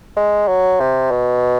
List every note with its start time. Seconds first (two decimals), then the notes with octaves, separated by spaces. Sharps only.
0.16 G#3
0.48 F#3
0.80 C3
1.11 B2